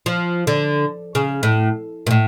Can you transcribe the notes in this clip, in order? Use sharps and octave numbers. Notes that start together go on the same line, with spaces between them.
F3
D3
C#3
A2
A#2
A2